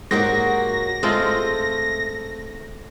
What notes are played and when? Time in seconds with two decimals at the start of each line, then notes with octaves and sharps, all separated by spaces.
0.11 G#2 F#3 A#3 F#4 G4 A#6
1.03 G#3 A3 C4 F4